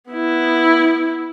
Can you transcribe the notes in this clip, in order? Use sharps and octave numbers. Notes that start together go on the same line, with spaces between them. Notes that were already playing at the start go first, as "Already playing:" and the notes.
B3 E4